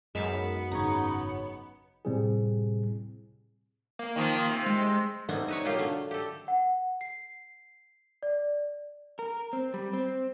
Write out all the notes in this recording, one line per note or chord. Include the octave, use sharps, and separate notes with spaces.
F#2 G#3 B3 D#4 E5 F5 B6
G#1 C#3 D#4 C#5
A2 C3 G3 C4 E4 G#4
A#3
D#3 F3
C3
G#3
G3 A3 B3 C4 D#4 E4
D#4 B4 C#5
B2 F#3 A#3 F4 G4 F5
D3 A3
G4 A4
F#5
C7
D5
A#4
C4
G3
C4